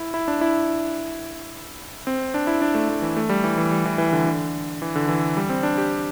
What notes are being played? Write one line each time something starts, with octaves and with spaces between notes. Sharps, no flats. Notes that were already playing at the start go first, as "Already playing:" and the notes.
Already playing: E4
E4
D4
E4
C4
D4
E4
D4
A3
A3
E3
A3
G3
E3
E3
G3
E3
E3
D3
D3
E3
D3
E3
G3
C4
D4
G4